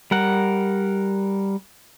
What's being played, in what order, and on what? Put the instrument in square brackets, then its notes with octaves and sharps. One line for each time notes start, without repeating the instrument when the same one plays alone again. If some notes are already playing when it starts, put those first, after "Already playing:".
[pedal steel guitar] G3 A#4 F#5